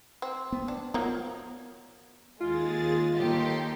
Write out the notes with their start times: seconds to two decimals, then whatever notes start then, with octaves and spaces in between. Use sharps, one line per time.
0.22 C4
0.52 B3
0.68 D4
0.94 F3 F#3 A#3 B3
2.40 D#2 G#3 F4 G#4 A6
3.17 D#2 D#4 G4 A4 G5 C6